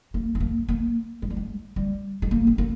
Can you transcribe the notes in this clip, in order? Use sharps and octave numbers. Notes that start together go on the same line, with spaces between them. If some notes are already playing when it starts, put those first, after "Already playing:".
A#3
C4
A#3
A#3
G#3
G3
G#3
G3
G#3
A#3
C4
A#3